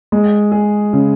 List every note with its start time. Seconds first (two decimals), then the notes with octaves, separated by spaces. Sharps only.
0.12 G#3
0.52 G#4
0.93 C#3